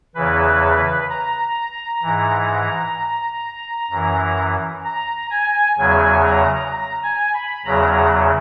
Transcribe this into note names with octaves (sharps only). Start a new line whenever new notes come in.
E2 C#3 E3 B4
A#5
G#2 E3
F#2 E3
A#5
G#5
E2 C#3 F#3 G#5
A#5
A#5
G#5
B5
E2 C#3 F#3 A#5